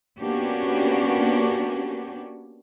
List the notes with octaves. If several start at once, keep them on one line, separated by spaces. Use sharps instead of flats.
A#3 B3 C#4 D4 F#4 G4